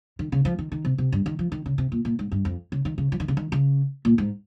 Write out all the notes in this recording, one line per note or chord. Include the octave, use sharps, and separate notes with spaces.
D#3
C#3
F3
D#3
D#3
C3
C3
G2
D#3
F3
D#3
C#3
C3
A#2
A#2
G#2
G2
F2
C#3
D#3
C#3
F3
D#3
C#3
D#3
C#3
A#2
G#2